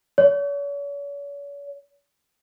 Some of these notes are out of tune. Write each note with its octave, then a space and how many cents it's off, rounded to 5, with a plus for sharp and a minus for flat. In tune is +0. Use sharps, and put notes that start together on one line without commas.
C#5 +40